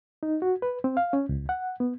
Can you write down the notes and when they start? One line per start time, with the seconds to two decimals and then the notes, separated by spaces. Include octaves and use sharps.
0.23 D#4
0.42 F#4
0.62 B4
0.84 C4
0.97 F5
1.13 C#4
1.29 C#2
1.49 F#5
1.80 B3